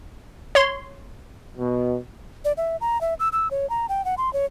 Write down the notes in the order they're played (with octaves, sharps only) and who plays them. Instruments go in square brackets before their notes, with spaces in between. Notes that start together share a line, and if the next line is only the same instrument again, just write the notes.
[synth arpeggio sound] C#5 C6
[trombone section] B2
[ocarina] D5
E5
A#5
E5
E6
E6
C#5
A#5
G5
F#5
C6
C#5